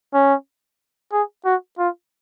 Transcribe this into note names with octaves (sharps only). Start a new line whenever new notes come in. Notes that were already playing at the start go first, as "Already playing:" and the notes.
C#4
G#4
F#4
F4